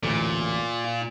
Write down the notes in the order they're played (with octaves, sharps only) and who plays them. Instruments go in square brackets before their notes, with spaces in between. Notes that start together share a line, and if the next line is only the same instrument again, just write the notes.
[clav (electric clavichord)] A1 D2 [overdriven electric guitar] A#2
[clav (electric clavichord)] F4